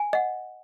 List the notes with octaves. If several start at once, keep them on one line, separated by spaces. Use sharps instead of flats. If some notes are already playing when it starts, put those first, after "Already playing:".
Already playing: G#5
D#5 F#5